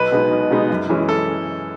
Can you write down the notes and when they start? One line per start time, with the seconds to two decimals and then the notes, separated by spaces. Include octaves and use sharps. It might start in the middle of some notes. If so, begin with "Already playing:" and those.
Already playing: B1 B4
0.12 B2 G#3 B3 D#4
0.31 B1
0.50 B2 G#3 B3 D#4
0.70 F#2
0.89 E3 G#3 C#4
1.09 A4